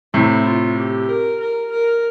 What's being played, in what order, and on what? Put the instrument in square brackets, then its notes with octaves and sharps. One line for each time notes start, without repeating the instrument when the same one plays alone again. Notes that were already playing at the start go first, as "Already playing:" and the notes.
[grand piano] A2 C3 [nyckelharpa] E4
[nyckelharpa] F4
G4
A#4
A#4
A#4